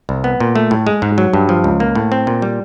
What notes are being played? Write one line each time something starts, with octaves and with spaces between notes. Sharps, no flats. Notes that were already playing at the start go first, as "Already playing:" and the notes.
C2
B3
A#2
A3
A2
G#3
G#2
F#3
G2
F3
C#2
A#3
A2
C4
A#2
G3